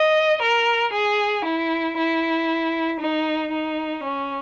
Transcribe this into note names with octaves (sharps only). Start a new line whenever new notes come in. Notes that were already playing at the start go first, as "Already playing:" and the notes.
Already playing: D#5
A#4
G#4
E4
E4
D#4
D#4
C#4